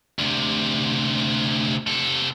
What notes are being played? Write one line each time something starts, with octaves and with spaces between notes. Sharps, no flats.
D2 C3
C3 A4